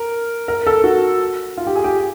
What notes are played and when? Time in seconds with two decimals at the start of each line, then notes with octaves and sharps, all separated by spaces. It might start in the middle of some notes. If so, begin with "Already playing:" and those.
Already playing: A#4
0.48 A#4
0.67 A4
0.84 F#4
1.58 F4
1.67 G4
1.76 G#4
1.84 G4